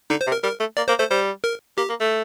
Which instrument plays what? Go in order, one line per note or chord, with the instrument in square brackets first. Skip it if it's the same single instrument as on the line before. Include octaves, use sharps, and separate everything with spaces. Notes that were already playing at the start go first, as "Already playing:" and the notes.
[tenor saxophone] D3 [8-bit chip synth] D#4
[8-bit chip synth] C5
[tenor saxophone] C3
[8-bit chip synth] A#4
[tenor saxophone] G3 [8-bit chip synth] A#4
[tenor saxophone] A3
[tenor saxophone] A#3 [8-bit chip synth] D5
[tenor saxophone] A#3 [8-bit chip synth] C5
[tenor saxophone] A3 [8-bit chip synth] C5
[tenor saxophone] G3 [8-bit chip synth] C5
[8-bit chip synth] A#4
[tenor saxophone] A#3 [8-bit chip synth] G4
[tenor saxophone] A#3
A3